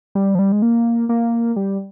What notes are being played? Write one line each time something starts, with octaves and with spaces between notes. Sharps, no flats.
G3
F3
G3
G#3
A#3
A#3
G3